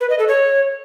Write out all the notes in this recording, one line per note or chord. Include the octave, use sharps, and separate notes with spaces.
B4
D#5
A4
C#5